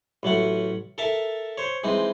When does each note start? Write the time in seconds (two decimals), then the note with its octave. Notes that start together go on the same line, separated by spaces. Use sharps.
0.23 A1 F#3 A3 F#5
0.98 A4 A#4 E5 A5 A#5
1.58 C5 C#5
1.84 E3 G#3 C4 D#4